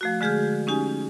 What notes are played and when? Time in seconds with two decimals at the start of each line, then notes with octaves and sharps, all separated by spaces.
0.01 F3 A3 F#4
0.21 D3 G#3 G#4 F6 G6
0.67 C#4 D#4 G4 G#5